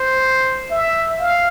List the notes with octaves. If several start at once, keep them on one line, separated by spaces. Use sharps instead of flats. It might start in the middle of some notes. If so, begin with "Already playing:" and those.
Already playing: C5
E5
F5